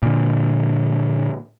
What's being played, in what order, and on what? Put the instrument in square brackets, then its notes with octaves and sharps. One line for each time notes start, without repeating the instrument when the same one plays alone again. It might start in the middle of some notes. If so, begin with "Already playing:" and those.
[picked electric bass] A#2 D3